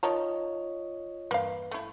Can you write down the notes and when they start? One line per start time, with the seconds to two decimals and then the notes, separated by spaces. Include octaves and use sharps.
0.03 D#3 F4 C#5 D#5 A5 A#5
1.31 E2 G2 A#3 B4 F5
1.71 A3 E4